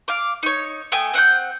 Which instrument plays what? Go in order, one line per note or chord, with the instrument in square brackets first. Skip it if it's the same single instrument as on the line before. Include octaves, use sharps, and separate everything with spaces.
[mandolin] F5 D6
D#4 C#5
A3 G5 G#5 D#6
C4 F#5 G5 G6